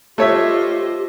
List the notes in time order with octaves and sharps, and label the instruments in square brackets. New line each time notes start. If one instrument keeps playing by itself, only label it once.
[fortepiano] A3 C#5 E5 [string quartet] F4 C5 D#5 [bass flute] G4